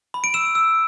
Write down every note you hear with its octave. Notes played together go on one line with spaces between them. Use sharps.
B5
D7
E6 E7
E6